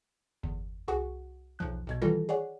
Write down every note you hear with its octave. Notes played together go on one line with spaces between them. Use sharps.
G1 E2
C2 F#4 G#4 F#5 C#6
B1 E2 F3 F#6
B1 B2 G#6
D#3 E3 G3 F4 A4 A#6
G#4 C#5 D5 F#5